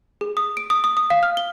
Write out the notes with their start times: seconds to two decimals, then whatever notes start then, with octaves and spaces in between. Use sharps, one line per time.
0.21 G#4
0.37 D#6
0.57 D7
0.70 D#6
0.84 D#6
0.97 D#6
1.10 F5
1.23 F6
1.37 G7